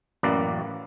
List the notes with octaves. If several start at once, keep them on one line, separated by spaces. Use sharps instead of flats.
A1 F#2 A#3 B4 D5